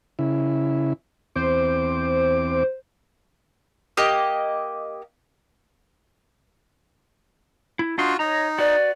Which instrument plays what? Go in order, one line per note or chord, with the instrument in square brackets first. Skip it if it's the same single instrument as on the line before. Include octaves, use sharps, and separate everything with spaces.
[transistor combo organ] C#3 E4
[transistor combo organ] E2 C4 D6 [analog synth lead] C5
[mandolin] A#3 G4 D#5
[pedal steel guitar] E4
[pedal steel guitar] D4 D#4 C6 [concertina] F4 F#4
[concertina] D#4 [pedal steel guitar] C#5 D#5 A#5
[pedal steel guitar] F#4 B4 [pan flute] D5